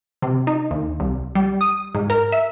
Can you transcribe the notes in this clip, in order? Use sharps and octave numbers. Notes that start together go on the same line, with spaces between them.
C3
D#4
D#2
C2
G3
D#6
G#2
A#4
E5